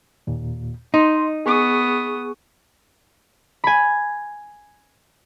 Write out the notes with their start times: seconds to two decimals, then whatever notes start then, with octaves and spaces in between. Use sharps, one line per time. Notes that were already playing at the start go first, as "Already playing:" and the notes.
0.27 D#2 A#2
0.94 D#4 D#5 C6
1.46 B3 G#4 C#6 D#6
3.64 G#5 B5